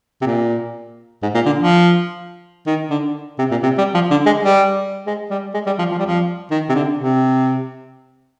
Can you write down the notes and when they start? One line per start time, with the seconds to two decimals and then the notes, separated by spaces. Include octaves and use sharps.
0.21 C3
0.26 A#2
1.22 G#2
1.34 A#2
1.46 D3
1.59 F3
2.67 D#3
2.90 D3
3.39 C3
3.51 A#2
3.63 C3
3.78 G3
3.94 F3
4.11 D3
4.26 G#3
4.43 G3
5.06 G#3
5.30 G3
5.54 G#3
5.66 G3
5.79 F3
5.91 F3
5.98 G3
6.06 F3
6.51 D#3
6.69 C3
6.75 D3
6.99 C3